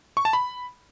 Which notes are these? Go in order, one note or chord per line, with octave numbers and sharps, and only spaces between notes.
C#6
A5
B5